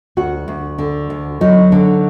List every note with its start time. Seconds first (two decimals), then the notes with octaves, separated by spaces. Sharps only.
0.17 D2 F#4
0.48 D2
0.78 D3
1.10 D2
1.41 F#3 D#4
1.72 D3